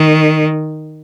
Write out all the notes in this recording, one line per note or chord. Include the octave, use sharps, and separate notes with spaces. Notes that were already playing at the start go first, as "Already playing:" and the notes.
Already playing: D#3